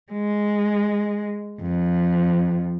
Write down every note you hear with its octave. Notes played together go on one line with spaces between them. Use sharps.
G#3
F2